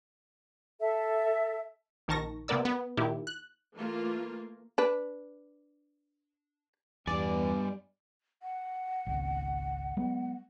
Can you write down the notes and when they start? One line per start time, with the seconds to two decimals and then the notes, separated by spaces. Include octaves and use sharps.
0.80 A4 E5
2.08 A#1 D#3 A#4 A5 C#6 A#6
2.48 C3 A#3 B3 A#4 D5 E6
2.65 B3
2.97 A#2 D#3 E4 G4
3.27 F#6
3.75 E3 A3 A#3 F4
4.78 D4 B4
7.07 E2 G2 G3 B3 D5 G#5
8.42 F#5
9.07 G#1 C#2
9.97 F#3 G#3 B3